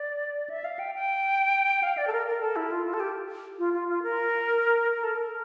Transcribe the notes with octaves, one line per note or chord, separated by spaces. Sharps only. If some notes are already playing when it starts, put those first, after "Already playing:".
Already playing: D5
E5
F5
G5
G5
F5
D5
A4
A#4
A#4
A4
E4
F4
F4
A4
G4
F4
F4
F4
A#4
A#4
A4
A#4